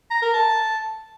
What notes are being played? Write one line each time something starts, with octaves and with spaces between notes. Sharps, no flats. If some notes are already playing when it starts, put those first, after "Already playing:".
A#5
A#4
A5